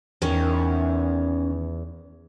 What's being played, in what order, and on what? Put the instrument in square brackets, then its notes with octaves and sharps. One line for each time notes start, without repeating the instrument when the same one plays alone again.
[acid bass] E2 [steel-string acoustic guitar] D#3 C#4 C#5